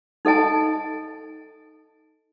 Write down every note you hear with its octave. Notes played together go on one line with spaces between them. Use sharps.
D#4 A4 D#5 G#5 A5